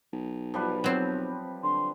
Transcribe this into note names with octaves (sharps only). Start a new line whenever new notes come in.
B1
F3 G3 B4
F#3 C4
D3 C6